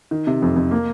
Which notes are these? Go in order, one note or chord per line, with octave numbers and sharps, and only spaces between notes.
D#3
C3
F2
F2
A#3